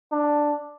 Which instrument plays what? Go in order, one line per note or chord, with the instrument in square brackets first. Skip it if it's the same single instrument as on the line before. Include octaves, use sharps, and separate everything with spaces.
[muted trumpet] D4